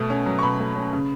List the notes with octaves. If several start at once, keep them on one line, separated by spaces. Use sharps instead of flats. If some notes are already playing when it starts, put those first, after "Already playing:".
Already playing: B2 A3
C#4
F#3
C#6
B2 B5
A3
C#4
C#3